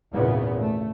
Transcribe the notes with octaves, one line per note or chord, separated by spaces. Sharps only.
G#1 E2 A#2 C#3 B3
A3